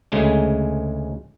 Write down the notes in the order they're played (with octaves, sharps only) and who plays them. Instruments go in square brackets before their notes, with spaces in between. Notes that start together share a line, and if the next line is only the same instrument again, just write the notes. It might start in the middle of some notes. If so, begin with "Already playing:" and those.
[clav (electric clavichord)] D2 C#3 G#3 A3